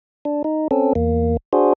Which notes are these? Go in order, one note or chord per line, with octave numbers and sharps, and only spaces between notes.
D4
D#4
C4 C#4 A4
E2 A#3
D4 F#4 G#4 C5